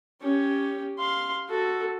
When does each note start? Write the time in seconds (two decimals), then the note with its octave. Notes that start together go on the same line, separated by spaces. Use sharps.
0.22 C#4 G4
0.98 F5 C6
1.49 F#4 A4